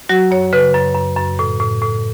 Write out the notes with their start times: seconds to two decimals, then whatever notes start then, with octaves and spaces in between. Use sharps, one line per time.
0.09 F#3 F#4
0.31 F#2 C#5
0.53 C#3 B4
0.74 F#2
0.95 F#2
1.17 F#2
1.39 A2
1.60 A2
1.82 A2